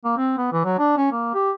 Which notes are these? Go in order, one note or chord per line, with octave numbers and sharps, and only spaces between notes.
A#3
C4
B3
E3
F#3
D4
C#4
A#3
G4